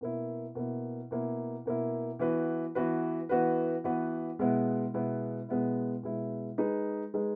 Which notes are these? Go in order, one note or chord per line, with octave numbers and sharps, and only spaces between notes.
B2 A#3 E4
B2 A#3 E4
B2 A#3 E4
B2 A#3 E4
E3 B3 F#4 B4
E3 B3 F#4 B4
E3 B3 F#4 B4
E3 B3 F#4 B4
B2 G#3 B3 E4
B2 G#3 B3 E4
B2 G#3 B3 E4
B2 G#3 B3 E4
G#3 D#4 G#4 B4
G#3 D#4 G#4 B4